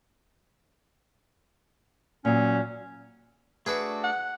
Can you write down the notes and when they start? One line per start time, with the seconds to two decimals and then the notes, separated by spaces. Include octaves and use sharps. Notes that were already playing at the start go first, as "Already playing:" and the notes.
2.25 A#2 F#3 C#4
3.66 A3 D4 F#4 G#4 B4 E5
4.04 F#5